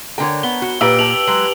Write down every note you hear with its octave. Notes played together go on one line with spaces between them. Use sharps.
D3 A#4 C#5 G5
B3 G7
F#4
A#2 G4 B4 F5 E6 D7
A5 E6 F7 F#7
F#3 G#3